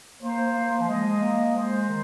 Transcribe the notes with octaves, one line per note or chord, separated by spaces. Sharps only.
A#3 C5
A#3
F3
G#3 D#5
A#3
G#3 C5
D#3